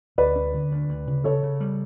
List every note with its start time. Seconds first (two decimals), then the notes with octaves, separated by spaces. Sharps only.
0.18 D2 B4 D5
0.36 C#4
0.54 D3
0.71 D2
0.89 D2
1.07 C#3
1.24 C#3 A4 C#5
1.43 C#3
1.60 G3